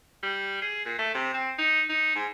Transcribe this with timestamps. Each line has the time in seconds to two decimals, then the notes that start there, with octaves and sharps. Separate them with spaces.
0.23 G3
0.62 G#4
0.86 A#2
0.99 A3
1.15 C3
1.34 C4
1.59 D#4
1.89 D#4
2.15 G#2